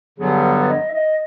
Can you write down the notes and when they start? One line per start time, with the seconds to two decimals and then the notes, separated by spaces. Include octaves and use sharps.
0.18 G2 D3 F#3 B3 G#4
0.61 D5
0.69 D#5
0.89 E5
0.93 D#5